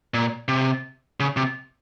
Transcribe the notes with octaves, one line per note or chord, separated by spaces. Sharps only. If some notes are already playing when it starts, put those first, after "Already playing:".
A#2
C3
C#3
C3